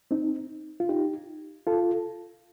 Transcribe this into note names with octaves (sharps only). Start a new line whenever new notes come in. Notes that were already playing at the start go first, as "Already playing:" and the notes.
C4 D#4
F4
D#4 G4
F4 A4